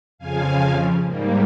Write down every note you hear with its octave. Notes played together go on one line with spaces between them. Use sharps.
F2 C#3 F3 F5 G#5
G#2 G3 A#3